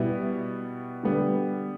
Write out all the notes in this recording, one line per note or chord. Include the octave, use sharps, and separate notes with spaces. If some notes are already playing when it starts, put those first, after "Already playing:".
Already playing: B2 G3 B3 E4
D3 G3 B3